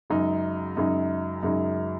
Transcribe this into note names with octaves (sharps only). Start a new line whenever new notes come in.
F#2 C#3 G#3 D#4
F#2 C#3 G#3 D#4
F#2 C#3 G#3 D#4